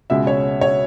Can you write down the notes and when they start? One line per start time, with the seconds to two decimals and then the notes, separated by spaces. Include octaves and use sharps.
0.10 C#2 B2 G#3 E5
0.27 C#5
0.61 C#5